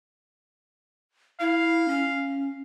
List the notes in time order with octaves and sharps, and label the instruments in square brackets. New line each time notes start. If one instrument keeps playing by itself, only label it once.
[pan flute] E4 [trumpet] F5
[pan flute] C#4